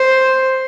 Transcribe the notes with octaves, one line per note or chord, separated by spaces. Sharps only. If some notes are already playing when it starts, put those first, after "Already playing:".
Already playing: C5